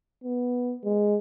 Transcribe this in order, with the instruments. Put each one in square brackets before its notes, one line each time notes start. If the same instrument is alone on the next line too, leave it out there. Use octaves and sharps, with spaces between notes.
[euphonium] B3
G#3